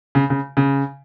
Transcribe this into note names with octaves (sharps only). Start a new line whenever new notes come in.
C#3
C#3
C#3